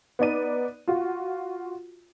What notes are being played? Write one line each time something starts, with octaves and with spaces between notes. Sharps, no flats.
B3 D#4 D5 D#7
F4 F#4